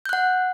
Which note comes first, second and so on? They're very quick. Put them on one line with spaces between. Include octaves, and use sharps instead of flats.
G6 F#6 F#5